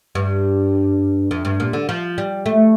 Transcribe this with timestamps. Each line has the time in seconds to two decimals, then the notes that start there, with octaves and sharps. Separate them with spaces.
0.15 G2
1.31 F2
1.45 G2
1.60 A#2
1.73 D3
1.89 F3
2.18 G3
2.46 A3